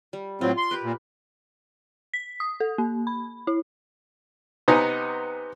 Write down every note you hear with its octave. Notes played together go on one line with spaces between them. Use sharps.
G3
A2 F#3 C4 F4
C6
G4 A#4 B4
A#2
B6
D#6
A4
A#3
B5
E4
C3 B3 D#4 G#5 A#5